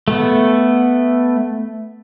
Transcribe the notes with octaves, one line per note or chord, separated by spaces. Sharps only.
A3 B3